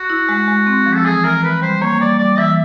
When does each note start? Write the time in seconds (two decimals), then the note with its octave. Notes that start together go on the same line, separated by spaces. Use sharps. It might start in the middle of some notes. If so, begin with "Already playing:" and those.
Already playing: F#4
0.10 E4
0.29 G#3
0.48 G#3
0.67 C4
0.86 F3
0.95 A4
1.05 E3 G#4
1.24 E3 A#4
1.43 E3 B4
1.62 G3 C5
1.82 A#3 C#5
2.00 G3 D5
2.19 G3 D5
2.38 E3 E5